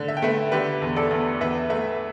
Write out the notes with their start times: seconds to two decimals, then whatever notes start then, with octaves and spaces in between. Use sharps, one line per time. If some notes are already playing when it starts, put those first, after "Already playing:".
Already playing: D3 A3
0.08 E5
0.17 G5
0.22 A3 B4 E5
0.52 D3 G4 B4
0.82 E2
0.96 A4 D5
1.11 E2
1.41 E2 B4 E5
1.70 A3 B4 E5